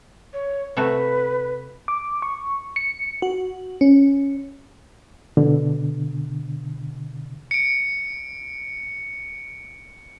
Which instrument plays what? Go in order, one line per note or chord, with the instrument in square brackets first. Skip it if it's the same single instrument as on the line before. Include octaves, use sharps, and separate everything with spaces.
[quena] C#5
[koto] C3 A3 F#4 [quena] B4
[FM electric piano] D6
C#6
C#7
F#4
C#4
[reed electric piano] B2 D3
[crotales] C#7 D7